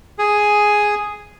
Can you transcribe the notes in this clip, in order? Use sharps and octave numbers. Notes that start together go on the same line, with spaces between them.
G#4